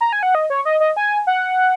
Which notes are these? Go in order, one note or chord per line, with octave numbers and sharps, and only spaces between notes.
A#5
G#5
F#5
D#5
C#5
D#5
D#5
G#5
F#5